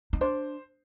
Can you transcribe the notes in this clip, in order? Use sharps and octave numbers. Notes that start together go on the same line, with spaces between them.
D#4
D4 C5